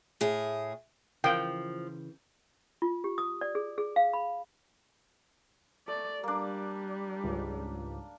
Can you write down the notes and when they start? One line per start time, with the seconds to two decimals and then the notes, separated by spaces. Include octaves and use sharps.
0.21 A2 G#4
1.24 C#3 E3 F3 A#4 F5 G5
2.82 F4
3.04 G4
3.18 D#6
3.41 D5
3.55 G#4
3.78 G#4
3.96 F5
4.13 B5
5.88 A3 D5
6.24 G3 A#3 D4
7.24 C#2 G#2 C#3